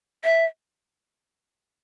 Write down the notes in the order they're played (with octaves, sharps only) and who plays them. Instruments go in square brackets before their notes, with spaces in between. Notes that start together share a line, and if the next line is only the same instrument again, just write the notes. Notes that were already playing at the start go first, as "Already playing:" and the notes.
[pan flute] E5